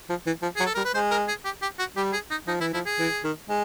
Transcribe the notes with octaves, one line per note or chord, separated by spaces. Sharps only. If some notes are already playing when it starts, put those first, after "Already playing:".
F3
E3
F3
F#3 G#4
A4
G3 A#4
B4
G#3 C5
A#4
G#4
G4
G4
F#4
G3 G4
G#4
D#4
F3 D#4
E3 E4
F3 E4
G#4
E3
D#3
G#3